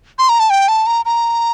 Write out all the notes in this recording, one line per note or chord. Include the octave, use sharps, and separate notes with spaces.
C6
A#5
A5
G5
A5
A#5
A#5